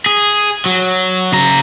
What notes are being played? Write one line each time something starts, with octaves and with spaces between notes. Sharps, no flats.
G#4
F#3
C#3 A#5